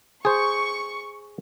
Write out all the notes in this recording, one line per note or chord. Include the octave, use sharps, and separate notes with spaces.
G#4 C5 C#6